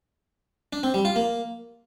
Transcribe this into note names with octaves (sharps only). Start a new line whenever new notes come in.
D4
C4
G3
F4
A#3